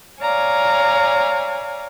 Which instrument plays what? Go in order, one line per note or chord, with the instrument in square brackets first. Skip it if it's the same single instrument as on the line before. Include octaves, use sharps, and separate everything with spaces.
[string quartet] C#5 D5 F5 G#5 A#5